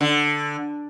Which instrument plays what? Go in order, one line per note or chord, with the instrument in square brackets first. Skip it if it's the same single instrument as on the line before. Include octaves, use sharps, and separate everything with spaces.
[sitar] D3